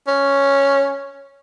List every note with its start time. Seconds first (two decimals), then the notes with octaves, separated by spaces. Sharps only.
0.07 C#4